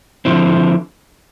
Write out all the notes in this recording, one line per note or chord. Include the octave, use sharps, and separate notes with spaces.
D3 F3 C4 E4